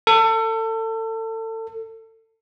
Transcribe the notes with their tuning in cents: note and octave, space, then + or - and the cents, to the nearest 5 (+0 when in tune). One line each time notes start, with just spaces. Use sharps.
A4 +30